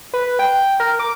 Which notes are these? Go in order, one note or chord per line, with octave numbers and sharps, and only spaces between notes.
B4
G5
A#4
D6